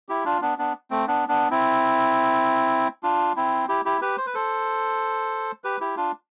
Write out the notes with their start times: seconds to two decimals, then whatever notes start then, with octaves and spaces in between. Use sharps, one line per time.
0.09 E4 G4
0.25 D4 F4
0.42 B3 D4
0.58 B3 D4
0.91 A3 C4
1.07 B3 D4
1.29 B3 D4
1.51 C4 E4
3.03 D4 F4
3.36 C4 E4
3.69 E4 G4
3.85 E4 G4
4.01 G4 B4
4.18 C5
4.26 B4
4.34 A4 C5
5.64 G4 B4
5.80 E4 G4
5.97 D4 F4